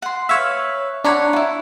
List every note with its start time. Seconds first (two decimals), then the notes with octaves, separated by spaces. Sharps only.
0.02 F#5 C6
0.29 B4 C#5 E5 F5
1.04 D4 C#5 F#5 A#5 B5 C#6
1.33 E4 F4